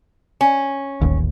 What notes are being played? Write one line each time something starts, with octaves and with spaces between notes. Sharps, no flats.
C#4
D#1 A1 D#2